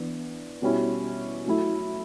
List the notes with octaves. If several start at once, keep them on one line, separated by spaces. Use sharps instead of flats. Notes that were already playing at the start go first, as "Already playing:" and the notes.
Already playing: E3 B3 D4
B2 G3 C#4 E4
F#3 A3 E4